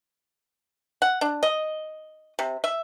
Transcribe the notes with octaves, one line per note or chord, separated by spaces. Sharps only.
F#5
D4
D#5
C3
E5